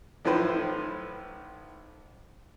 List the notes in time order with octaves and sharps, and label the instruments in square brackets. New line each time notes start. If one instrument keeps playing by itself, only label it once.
[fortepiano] A1 A2 D#3 F3 B4 C5